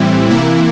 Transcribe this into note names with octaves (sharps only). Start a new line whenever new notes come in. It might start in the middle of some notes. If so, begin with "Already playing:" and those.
Already playing: A2 E3 G3 C4 E4
C3 E3 A#3 E4